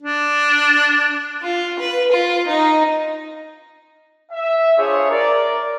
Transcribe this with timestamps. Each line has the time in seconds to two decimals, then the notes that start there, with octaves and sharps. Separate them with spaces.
0.03 D4
1.43 F4
1.79 B4
2.12 F4
2.47 D#4
4.31 E5
4.78 D4 F4 G#4 C5 C#5
5.10 A#4 D5